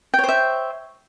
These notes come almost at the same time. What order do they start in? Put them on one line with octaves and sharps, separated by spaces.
G5 C#5 C5 E5